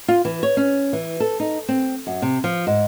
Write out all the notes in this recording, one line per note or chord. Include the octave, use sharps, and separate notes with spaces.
F4
E3
C#5
C#4
E3
A4
D#4
C4
F#2
C3
F3
G#2